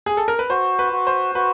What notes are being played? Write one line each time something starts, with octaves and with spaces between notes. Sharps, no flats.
G#4
A4
A#4
B4
F#4 C5
B4
F#4
C5
F#4 B4